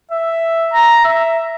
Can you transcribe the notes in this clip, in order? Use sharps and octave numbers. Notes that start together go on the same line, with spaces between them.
E5
A#5
E5